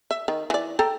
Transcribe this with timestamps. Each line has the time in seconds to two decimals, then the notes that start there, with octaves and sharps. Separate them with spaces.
0.11 E5
0.28 D#3
0.50 E3 D5
0.79 A4 G5 A#5